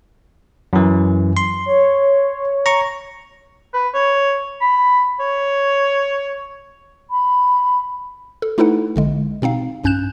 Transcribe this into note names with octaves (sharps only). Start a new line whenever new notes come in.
F#2 E3
C6
C#5
A#5 C#6
B4
C#5
B5
C#5
B5
A4
A3 D#4 E4 A4 B4 F#5
A#1 D3 G#3
B2 C4 D#4 F5
B1 G2 C#4 F#6 G6 E7